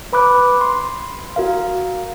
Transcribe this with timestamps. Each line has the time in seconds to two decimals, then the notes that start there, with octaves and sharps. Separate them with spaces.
0.13 B4 B5 D6 F#6
0.61 C6
1.36 F#4 A#4 F5